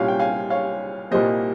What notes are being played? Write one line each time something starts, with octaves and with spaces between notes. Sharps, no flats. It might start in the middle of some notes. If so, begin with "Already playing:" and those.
Already playing: C2 A#2 G3 C#4 F5 G#5
G5
F5 G#5
C#5 F5
C2 A#2 G3 A#3 C5 D#5